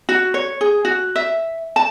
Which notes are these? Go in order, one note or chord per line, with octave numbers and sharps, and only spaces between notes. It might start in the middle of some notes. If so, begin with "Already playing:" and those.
F#4
C#5
G#4
F#4
E5
A5